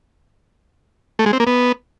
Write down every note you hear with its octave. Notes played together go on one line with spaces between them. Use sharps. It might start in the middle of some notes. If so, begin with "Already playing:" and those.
A3
G#3
C4
A#3
B3